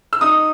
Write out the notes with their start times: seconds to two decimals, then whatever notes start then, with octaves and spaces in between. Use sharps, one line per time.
0.13 E6
0.21 D#4 D#6